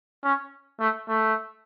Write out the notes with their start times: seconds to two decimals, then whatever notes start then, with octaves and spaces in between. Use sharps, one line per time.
0.24 C#4
0.80 A3
1.08 A3